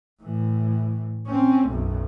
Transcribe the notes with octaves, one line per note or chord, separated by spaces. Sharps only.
A2 E3
C4 C#4
B1 F#2